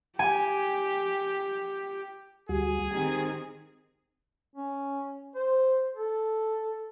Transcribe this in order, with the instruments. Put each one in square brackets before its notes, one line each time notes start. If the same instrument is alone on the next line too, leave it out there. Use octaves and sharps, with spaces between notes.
[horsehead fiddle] G4 [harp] G#5
[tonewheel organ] D2 G3 F#4 [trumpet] G#4
[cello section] D#3 G#3 C4 [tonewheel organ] G4
[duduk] C#4
C5
A4